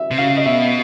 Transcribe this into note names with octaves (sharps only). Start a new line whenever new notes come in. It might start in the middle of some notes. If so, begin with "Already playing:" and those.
Already playing: E5
C3
C#3 F5
D#5
B2 E5